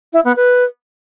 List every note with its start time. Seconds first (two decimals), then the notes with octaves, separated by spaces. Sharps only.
0.13 E4
0.25 B3
0.36 B4